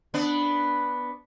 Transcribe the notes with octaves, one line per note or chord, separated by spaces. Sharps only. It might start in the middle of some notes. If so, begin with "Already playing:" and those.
B3 D4